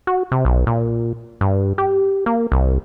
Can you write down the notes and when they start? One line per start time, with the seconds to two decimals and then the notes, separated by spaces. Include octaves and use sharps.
0.07 F#4
0.32 C3
0.45 B1
0.67 A#2
1.41 G2
1.78 G4
2.26 A#3
2.52 C2